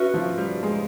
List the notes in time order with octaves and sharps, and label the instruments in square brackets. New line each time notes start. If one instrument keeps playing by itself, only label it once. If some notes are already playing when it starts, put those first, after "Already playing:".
Already playing: [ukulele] C#4 F#4 B4 E5
[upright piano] F3
G3
G#3